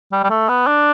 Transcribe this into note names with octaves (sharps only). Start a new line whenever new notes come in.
G3
G3
A3
B3
D4